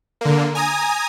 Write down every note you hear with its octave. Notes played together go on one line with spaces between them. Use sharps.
D3 A#3
G#5 A#5 D#6